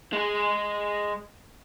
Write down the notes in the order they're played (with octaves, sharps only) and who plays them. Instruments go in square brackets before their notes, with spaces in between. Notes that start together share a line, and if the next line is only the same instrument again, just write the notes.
[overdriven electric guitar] G#3 G#4